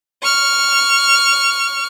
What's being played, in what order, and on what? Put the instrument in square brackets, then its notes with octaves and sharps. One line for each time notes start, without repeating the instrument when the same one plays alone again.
[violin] C#6 F6